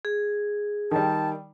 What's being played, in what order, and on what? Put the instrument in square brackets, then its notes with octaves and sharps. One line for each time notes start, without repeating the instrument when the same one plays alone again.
[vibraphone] G#4
[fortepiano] D#3 G3 [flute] A5